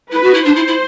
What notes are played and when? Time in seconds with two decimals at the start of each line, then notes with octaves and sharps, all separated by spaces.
0.12 E4 B4
0.23 F#4
0.34 E4
0.44 D4 C5
0.56 E4
0.67 E4